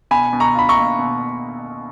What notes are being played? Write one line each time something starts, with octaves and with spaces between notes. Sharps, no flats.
B2 G#5 B5
B2
A#5 C#6
F4 B5
A#5 C#6
A#3
B2